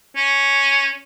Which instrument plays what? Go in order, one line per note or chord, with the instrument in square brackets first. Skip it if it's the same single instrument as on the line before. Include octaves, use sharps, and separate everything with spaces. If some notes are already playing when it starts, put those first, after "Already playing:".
[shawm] C#4